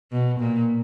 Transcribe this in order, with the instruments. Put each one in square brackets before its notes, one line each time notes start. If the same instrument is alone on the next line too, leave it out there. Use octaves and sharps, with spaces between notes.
[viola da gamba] B2
A#2